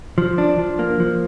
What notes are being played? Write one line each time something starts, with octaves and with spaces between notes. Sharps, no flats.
F3
D4
F3
A#3
F3